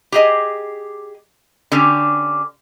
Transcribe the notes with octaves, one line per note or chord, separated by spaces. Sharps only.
G4 G#4 D#5
D3 C#4 G4